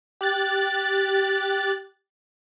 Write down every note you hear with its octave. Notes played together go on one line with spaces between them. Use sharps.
G4 F#6 A6